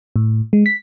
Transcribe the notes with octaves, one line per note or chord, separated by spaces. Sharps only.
A2
G#3
B6